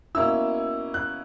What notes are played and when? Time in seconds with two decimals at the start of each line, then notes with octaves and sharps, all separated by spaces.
0.15 B2 A#3 C#4 E4 E6
0.94 F#6